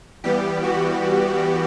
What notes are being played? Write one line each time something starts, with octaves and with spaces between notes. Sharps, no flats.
E3 G3 B3 G4
F#4